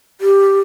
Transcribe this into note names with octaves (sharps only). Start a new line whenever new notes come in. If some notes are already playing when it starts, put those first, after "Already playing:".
G4